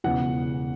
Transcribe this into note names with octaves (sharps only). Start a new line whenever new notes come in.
E1 E2 C#3 E3 F#5